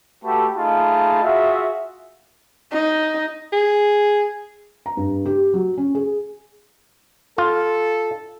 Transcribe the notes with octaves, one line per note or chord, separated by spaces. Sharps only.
A3 F#4 G4 A4 B4 A5
A3 D#4 F4 G#4 A5 B5
F4 F#4 G#4 E5
D#4
G#4
A#5
G2
G4
F#3
C#4
G#4
F4 A4